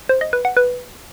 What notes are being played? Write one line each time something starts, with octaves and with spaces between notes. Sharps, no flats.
C5
D#5
B4
F#5
B4